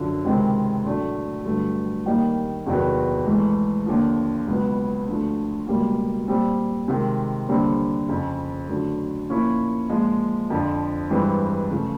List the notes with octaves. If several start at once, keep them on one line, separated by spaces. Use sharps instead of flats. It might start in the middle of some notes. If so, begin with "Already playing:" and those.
Already playing: F#2 D3 F3
C#2 C3 D#3 G#3 C4
A2 F#3 A3 D4
G2 D3 F#3 A3
D#2 D#3 G3 A#3 D#4
E2 C3 D#3 F#3 B3
G#2 E3 A3
D#2 D3 F3
C#2 B2 F#3 B3
D2 D3 F3 A3
C#2 B2 G3 A#3
A#2 G3 C4
C3 D#3 G#3
D#2 D3 G3 C4
F2 C#3 F3
D3 F#3 A3
A#2 F3 A#3 C#4 E4
A#2 F3 G#3
F2 D3 F3
G2 E3 G#3 C4
C#3 F3 A3